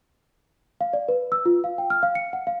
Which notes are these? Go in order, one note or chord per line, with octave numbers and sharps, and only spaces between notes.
F5
D5
B4
E6
F4
F5
G5
F6
F5
C#7
F#5
F5